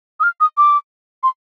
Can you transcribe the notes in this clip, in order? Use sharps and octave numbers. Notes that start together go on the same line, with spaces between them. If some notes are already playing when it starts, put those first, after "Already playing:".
D#6
F6
D#6
D6
C6